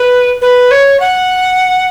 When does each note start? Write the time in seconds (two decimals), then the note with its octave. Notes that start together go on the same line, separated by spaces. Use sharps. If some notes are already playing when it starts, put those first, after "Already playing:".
Already playing: B4
0.42 B4
0.71 C#5
1.00 F#5